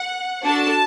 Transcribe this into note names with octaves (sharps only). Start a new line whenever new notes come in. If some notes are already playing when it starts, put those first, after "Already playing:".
Already playing: F#5
D4 F#4 A4 A5